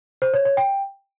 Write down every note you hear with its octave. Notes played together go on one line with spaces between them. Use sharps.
C5
C#5
C#5
G5